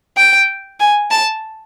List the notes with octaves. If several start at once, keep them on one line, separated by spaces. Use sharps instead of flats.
G5
G#5
A5